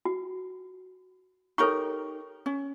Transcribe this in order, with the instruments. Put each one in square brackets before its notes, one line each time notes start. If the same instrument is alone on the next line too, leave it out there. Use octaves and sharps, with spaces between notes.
[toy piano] F#4
[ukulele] D#4 G4 A#4 [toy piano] A4 C#5 C#6
[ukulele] C#4